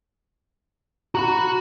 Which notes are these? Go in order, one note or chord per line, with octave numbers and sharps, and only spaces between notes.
F#4 F#5 A#5 B5